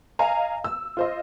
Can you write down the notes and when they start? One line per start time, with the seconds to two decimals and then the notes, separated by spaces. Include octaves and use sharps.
0.19 D#5 F5 G#5 A#5
0.64 E6
0.97 F4 C5 D#5